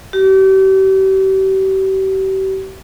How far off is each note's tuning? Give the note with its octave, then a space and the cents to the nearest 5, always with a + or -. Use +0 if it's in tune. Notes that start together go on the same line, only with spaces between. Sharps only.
G4 -40